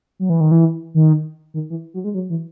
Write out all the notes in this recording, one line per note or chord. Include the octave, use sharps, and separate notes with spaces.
F#3
E3
D#3
E3
D#3
D#3
E3
F#3
G#3
F#3
E3